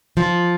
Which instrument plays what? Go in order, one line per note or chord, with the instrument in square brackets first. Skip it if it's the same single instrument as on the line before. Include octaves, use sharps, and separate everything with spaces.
[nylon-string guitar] F3